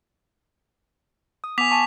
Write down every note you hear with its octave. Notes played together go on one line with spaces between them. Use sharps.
D#6
B3 G#5 D6 B6 F7
G#5 A5 C#6